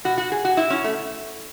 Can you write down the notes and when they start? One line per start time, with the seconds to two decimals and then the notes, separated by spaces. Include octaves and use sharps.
0.04 B2 F#4
0.18 F#4
0.32 G#4
0.45 F#4
0.57 E4
0.70 C#4
0.84 A3